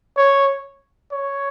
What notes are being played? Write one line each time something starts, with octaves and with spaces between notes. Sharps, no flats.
C#5
C#5